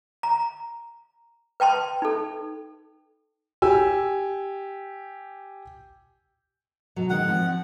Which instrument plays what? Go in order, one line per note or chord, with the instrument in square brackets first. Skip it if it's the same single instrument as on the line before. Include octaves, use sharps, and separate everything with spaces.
[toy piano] A#5
B4 G5 A5 C6
D#4 A4
[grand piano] G4 G#5 E6
[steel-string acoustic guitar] B2 F#3
[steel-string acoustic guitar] D#3 G#3 D#4 [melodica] F#5
[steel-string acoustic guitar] F3 C4